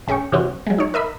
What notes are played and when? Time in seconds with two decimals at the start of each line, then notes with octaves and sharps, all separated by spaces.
0.07 A1 C#4 G#4 G5 C#6
0.32 G2 C3 E3 C4 C#4 F#4
0.67 F#3 G#3
0.78 D#4 C#5
0.94 A#4 D#5 E5 B5